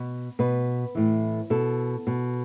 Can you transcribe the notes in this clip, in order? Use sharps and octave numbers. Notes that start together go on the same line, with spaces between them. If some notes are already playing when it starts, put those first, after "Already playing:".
Already playing: B2
B2 B4
A2 E3
B2 A4
B2